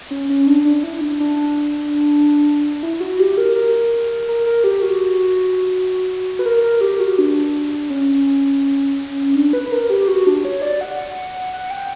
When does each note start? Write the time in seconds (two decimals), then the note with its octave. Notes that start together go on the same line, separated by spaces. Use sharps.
0.11 C#4
0.30 C#4
0.47 D4
0.65 D4
0.83 E4
1.01 D4
1.20 D4
2.83 E4
3.00 F#4
3.19 G4
3.38 A#4
3.56 A#4
4.28 A#4
4.46 A#4
4.64 G4
4.82 F#4
6.39 B4
6.46 A#4
6.64 A#4
6.81 G4
7.00 F#4
7.19 D4
7.90 C#4
9.35 D4
9.53 B4
9.66 B4
9.72 A#4
9.90 G4
10.08 F#4
10.27 D4
10.45 C#5
10.62 D5
10.81 F#5
11.54 F#5
11.71 G5